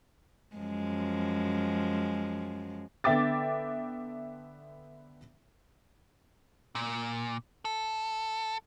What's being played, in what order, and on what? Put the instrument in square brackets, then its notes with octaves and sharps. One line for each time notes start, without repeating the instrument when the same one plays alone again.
[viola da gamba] F#2 F3 G#3
[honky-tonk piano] D3 B3 E5 G5 D6 A6
[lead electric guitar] A#2
A4